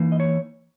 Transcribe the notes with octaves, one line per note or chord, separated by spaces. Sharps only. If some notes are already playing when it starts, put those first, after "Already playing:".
Already playing: E3 A#3 D#4
D#5
C#5